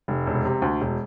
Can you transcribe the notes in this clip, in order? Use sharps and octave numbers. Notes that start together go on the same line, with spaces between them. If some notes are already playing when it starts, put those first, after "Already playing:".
F1
E1
C3
D2
E1